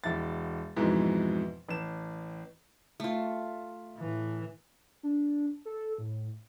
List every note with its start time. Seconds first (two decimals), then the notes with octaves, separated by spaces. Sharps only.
0.04 E1 E4 A6
0.77 F2 G#2 B2 E3
1.68 A1 E7
3.00 A3 F4
3.98 A2 E3
5.03 D4
5.65 A4
5.98 A2